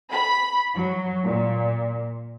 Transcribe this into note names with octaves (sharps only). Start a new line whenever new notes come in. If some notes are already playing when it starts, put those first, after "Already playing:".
B5
F#3
A#2